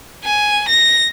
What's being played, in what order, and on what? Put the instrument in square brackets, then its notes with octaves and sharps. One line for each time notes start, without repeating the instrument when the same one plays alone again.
[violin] G#5
A#6